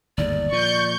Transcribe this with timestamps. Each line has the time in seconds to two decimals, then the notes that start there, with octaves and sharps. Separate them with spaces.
0.18 G1 D#2 G#2 D5
0.52 A#2 F3 C#6 G6